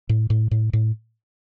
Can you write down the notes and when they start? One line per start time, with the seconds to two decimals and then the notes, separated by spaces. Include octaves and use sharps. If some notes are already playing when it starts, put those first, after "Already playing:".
0.09 A2
0.30 A2
0.51 A2
0.73 A2